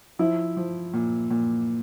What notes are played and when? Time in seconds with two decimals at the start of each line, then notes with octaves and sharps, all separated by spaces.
0.19 F3 E4
0.57 F3
0.94 A#2
1.31 A#2